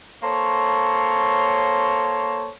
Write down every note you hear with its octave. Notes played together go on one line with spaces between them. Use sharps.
A#3 A4 C5 C#5